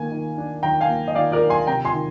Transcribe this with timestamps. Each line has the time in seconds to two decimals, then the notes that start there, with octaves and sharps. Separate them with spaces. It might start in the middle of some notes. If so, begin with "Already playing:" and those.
Already playing: D#3 A#3 G#5
0.12 D#3
0.38 D4
0.63 D#3 G5 A#5
0.81 F5 G#5
0.89 A#3
1.08 D#5
1.15 D#3 D5 F5
1.32 A#4 D5
1.41 D4
1.50 G#5 C6
1.67 C3 G5 A#5
1.85 G#5 C6
1.93 D#3